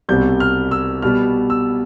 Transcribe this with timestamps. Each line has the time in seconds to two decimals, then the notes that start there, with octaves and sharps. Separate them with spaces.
0.09 C2 B2 G3 C4 G6
0.40 F6
0.71 E6
1.02 B2 G3 B3 F6
1.50 E6